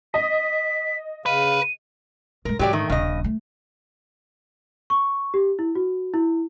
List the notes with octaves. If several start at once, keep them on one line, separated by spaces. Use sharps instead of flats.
D#5 B6
C#3 B4 F5 D#7
A2 G#3 A#4
G#2 E3 F#3 G4 D5
D#3 A3
D#1 G2 C#3 D#5
A3
C#6
G4
E4
F#4
E4